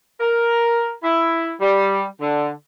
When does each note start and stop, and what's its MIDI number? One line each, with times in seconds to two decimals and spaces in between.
0.20 0.93 70
1.03 1.53 64
1.60 2.05 55
2.21 2.51 50